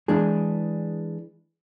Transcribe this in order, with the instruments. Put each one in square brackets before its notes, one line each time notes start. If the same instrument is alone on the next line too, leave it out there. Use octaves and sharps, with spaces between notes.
[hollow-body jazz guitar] E3 G#3 D4 G#4